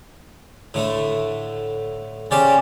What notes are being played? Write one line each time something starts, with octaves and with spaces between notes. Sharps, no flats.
A2 D3 A3
C#3 C#4 G4 C5 D5